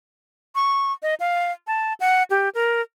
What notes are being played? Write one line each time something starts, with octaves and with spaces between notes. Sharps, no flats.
C#6
D#5
F5
A5
F#5
G4
A#4